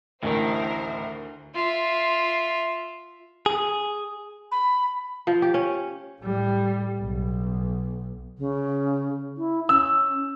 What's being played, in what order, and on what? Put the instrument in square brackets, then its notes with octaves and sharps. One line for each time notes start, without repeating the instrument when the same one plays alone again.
[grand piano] A1 E4 [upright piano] D2 [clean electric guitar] A2 D#3 [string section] A#4 C5
[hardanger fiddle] F4 E5
[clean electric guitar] G#4
[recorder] B5
[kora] F3
G4
C#4
[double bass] A2 G3
B1
[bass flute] C#3
E4
[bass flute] C#4 [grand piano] E6